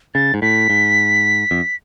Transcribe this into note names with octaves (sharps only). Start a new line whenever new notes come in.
C#3 A6
G#2
A2 B6
G#2
F2